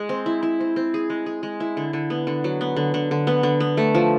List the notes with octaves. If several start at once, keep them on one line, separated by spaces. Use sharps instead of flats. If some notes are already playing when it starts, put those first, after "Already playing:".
Already playing: G#3 G#4
C4
E4
E4
C4
C4
G#4
G#3
G#4
G#3
E4
D3
D3
B3
D3
F#3
B3
D3
D3
D3
B3
D3
B3
A3
F3